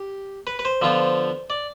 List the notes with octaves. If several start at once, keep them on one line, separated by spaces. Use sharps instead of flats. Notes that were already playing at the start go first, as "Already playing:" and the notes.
Already playing: G4
B4
B4
C5
D3 F3 B3 F4
D5